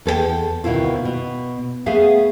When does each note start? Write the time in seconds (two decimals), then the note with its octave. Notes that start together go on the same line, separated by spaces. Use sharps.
0.05 E2 A4 A#4 G5
0.64 D2 B2 D#3 C4 E4 F4
1.05 B2
1.86 A3 B3 G#4 E5 F5